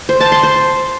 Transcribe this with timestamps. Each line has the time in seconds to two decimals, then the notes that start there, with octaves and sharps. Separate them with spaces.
0.09 C5
0.20 A5
0.32 C6
0.43 C5